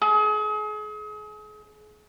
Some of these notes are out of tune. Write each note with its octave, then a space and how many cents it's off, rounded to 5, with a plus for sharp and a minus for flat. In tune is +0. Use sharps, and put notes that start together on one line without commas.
G#4 +35